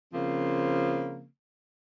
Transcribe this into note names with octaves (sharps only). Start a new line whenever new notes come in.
C#3 F3 A#3 C4